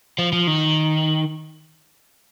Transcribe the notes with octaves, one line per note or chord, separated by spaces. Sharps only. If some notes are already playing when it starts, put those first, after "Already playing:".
F3
F3
D#3